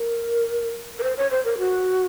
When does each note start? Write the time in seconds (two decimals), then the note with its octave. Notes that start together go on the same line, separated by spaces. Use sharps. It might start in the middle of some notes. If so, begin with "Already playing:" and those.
Already playing: A#4
0.99 A#4
1.03 C5
1.17 C#5
1.31 C5
1.45 A#4
1.58 F#4